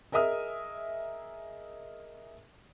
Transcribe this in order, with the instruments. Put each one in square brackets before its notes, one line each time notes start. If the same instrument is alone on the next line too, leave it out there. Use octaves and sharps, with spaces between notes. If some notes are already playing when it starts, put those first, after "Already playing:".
[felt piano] G#4 A#4 D#5 E5 D#6 F6